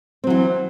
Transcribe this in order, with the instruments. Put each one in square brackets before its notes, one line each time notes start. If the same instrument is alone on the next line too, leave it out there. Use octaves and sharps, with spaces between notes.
[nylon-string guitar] C4
F#3
E3